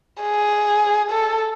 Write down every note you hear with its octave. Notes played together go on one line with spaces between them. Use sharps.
G#4
A4